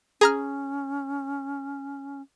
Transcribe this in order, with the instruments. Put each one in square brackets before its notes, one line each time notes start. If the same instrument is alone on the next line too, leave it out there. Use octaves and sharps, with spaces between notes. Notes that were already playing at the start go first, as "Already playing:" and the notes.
[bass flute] C#4 [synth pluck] G#4 A#5 F6